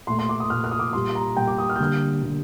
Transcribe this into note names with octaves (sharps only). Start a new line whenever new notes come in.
A#2 A3 C6
C6
D6
D#6
A#2 A3 F6
F6
D#6
D6
A#2 G3 A#3 C6
A#5
A#2 G3 A#3 G5
D6
D#6
F6
G6
D3 G3 A#3 F6
D3 G3 A#3